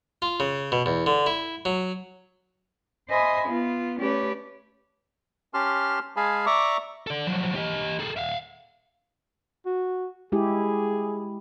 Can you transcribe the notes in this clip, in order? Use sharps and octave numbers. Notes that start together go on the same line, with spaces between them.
F4
C#3
B2
E2
D3
E4
F#3
C5 D#5 E5 G#5 B5 C6
B3 F4
A3 C#4 G4 B4 C#5 D5
C#4 G4 A5 C6 F6
G#3 G#4 F5 G#5 A5 B5
D5 E5 A#5 C#6 D6
A4 D5
F3 F#3
G4 D#5
G#4 A4
E5 F5
F#4
G#3 E4 G4 G#4